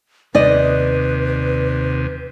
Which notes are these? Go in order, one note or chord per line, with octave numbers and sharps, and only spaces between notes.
D#2 C3 B4 D5 D#5